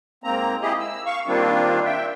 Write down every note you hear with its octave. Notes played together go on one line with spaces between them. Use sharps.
G#2 A#3 C4 A#5
E4 G4 G#4 D#5
E6
F5 C#6
D#3 G3 A#3 C4 D4 F4
E5 G5